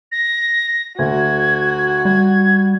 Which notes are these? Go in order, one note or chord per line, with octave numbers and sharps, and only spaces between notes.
A#6
D2 F#4 G#6
G3 G#6